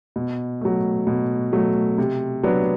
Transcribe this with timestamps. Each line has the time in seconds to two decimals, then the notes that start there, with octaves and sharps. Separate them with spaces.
0.16 B2
0.61 F#3 A3
1.07 B2
1.53 F#3 A3
1.98 C3
2.44 F#3 B3 D4